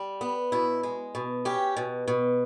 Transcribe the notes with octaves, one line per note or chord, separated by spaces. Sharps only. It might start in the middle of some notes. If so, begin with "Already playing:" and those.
Already playing: G3
B3
B2 E4
G#3
B2
C#4 G4
B2
B2